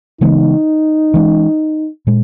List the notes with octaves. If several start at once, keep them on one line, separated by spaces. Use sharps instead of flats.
C#3 E3 G#3 B3 D#4
E3 G#3 C#4
A#2 G#3